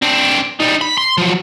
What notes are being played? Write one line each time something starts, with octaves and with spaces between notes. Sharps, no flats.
C4 D4
G3 D#4
B5
C6
F3 F#3